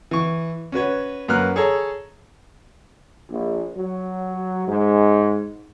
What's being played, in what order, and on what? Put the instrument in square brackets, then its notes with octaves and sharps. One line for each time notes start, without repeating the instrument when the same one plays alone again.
[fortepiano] E3 C#6
C#4 F#4 B4 C#5
F#2 A#3 B4 F6 F#6
G#4 A4 C#5 A#5
[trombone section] A#1
F#3
G#2